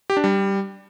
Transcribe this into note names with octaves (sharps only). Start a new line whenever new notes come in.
G4
D4
G3